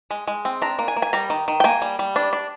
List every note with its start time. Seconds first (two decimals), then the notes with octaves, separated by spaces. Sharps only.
0.11 G#3
0.27 G#3
0.45 C4
0.62 D4 A#5
0.79 A#3
0.88 G#5
0.96 A#3
1.02 G#5
1.13 G3 A#5
1.30 D#3
1.48 D#3
1.60 G5
1.64 A#3 G#5
1.82 G3
1.99 G3
2.16 D4
2.33 D4